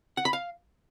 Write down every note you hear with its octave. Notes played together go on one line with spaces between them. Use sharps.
F#5
B5
F5